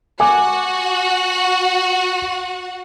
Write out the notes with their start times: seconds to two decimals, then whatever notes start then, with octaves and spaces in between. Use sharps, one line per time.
0.20 F#4 F#5 G#5 D6